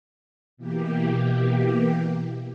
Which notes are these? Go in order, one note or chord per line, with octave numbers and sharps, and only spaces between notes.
B2 E3 A#3 G4